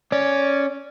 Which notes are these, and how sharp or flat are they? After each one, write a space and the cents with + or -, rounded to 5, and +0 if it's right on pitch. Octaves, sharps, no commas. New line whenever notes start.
C#4 +0 D5 -10